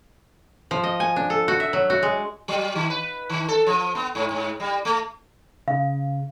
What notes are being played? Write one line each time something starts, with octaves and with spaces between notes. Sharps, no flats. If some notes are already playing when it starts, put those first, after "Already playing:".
F3
D#5
G#5
D4
A4
F#4
E5
F#3
F#4
G#3
F#3
D#3
B4
D#3
A4
F3
B3
G#2
G#2
G3
A3
C#3 F5